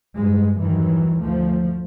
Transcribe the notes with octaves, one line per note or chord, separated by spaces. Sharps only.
G2 G#3
E2 G2 D#3 E3 F#3
D2 F3 A3